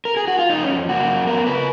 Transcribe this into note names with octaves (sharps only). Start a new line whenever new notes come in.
A#4
G#4
F#4
F4
F2 D#4
C#4
F2
A#3 F#4
F#2
B3 A#4
C#3 B4